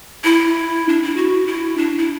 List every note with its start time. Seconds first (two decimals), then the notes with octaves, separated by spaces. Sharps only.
0.24 E4
0.89 D4
1.03 E4
1.16 F#4
1.47 E4
1.77 D4
1.98 E4